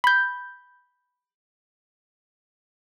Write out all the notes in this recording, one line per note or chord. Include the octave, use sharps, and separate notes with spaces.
B5 G6